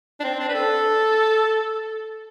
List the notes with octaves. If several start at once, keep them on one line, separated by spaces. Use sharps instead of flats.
D4
C4
D4
B4
A4